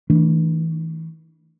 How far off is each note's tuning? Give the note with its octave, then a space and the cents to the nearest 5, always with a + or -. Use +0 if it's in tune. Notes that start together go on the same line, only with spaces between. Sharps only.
E3 -35 A3 +0 D4 +0